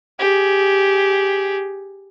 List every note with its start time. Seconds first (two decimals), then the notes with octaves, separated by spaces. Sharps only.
0.19 G4 G#4